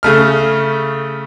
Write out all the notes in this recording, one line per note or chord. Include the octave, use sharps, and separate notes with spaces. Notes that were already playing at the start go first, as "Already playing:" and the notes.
C#3 A3 F6